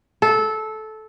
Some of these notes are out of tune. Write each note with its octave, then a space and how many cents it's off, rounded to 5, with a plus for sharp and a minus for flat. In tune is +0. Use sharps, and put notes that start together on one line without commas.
A4 -15